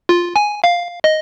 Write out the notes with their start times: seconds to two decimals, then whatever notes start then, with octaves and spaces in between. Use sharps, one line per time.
0.09 F4
0.36 G#5
0.64 F5
1.04 D#5